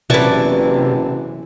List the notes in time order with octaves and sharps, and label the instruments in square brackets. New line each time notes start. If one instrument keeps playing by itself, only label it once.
[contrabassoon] F#1 [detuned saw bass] C3 [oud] E3 B3 [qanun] D5 A5 C#6